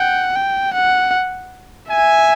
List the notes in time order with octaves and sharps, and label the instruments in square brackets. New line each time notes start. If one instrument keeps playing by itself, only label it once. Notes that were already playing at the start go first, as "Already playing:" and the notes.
Already playing: [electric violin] F#5 [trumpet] G5
[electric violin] G5
F#5
[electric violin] E5 [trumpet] G#5